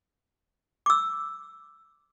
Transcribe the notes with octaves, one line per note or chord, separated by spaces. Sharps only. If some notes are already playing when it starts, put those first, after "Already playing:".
D6 E6